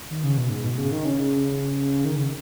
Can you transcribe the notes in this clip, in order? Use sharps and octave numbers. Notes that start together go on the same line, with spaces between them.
D#3
C#3
B2
G#2
B2
C#3
D#3
C#3
D#3
C#3